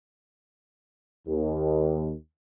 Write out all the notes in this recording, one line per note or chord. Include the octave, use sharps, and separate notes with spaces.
D#2